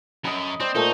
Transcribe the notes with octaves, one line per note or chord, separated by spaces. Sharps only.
F#2 D#5 B5
C4 C5 D5
A#2 A3 D#4